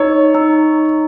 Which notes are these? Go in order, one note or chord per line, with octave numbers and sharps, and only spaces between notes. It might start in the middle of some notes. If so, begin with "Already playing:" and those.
Already playing: D#4 C#5
D#4